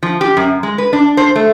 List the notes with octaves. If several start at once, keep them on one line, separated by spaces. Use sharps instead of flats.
F3
G4
F#2
G#3
B4
D4
C5
A3